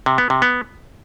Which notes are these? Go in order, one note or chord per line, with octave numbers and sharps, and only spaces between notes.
C3
B3
C3
B3